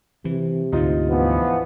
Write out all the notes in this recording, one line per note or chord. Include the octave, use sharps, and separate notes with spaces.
C3 E3
D2 G#2 D3 D#4 F4
E3 F3 B3